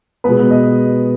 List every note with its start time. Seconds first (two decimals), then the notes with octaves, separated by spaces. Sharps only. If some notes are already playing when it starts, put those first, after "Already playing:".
0.24 B2 G#3 B3 B4
0.51 D#5